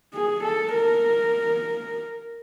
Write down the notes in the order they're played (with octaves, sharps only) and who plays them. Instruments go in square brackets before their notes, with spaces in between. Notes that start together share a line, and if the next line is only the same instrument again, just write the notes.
[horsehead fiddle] G#4
A4
A#4